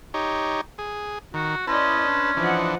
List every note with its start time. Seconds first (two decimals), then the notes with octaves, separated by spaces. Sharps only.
0.14 D#4 G4 C#5
0.78 G#4
1.34 D#3 F#4
1.67 C#4 E4 B4 D5 D#5 A5 C6
2.07 D4
2.37 E3 F3 D4 D#5 F#5